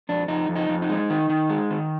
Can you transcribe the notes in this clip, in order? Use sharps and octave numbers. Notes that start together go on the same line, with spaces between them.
F2 D4
F2 D#4
F2
D#4
F2
D#4
G#3
D#3
D#3
G#3
D#3